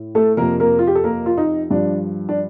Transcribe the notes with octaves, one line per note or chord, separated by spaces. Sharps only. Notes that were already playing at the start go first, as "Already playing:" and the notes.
Already playing: A2
A3 A4
F2 C3 F3 A#3 A#4
A#3 A#4
F4
G4
A4
A#3 A#4
F4
D#4
G2 F3 D4
D4